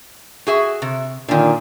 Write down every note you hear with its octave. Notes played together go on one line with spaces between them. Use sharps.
F#4 G#4 E5
C3
A#2 D3 D#3